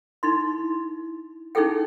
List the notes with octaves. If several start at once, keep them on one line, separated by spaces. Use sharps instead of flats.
D#4 E4 C6
C#4 D#4 E4 G#4 A4 G5